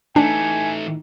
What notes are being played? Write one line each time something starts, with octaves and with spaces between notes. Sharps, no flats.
A2 E3 A3 D4 D#4 G#5